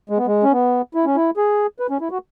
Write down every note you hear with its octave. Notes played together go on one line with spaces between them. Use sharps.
G#3
B3
G#3
C#4
B3
E4
C#4
E4
G#4
B4
C#4
E4
F#4